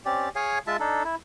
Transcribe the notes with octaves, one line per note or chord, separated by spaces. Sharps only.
C4 C#4 G4 D5
G#4 C#5 F5 G#5
G#3 F4 E5 A5
D4 D#4 A4
E4